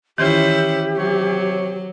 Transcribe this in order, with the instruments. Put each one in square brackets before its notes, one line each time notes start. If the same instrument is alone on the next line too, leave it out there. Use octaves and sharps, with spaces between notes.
[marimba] D#3 E3 F4 [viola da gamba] C#4 E4 [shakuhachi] G4 [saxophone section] C5
[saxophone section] C3 C#5 [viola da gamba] F#3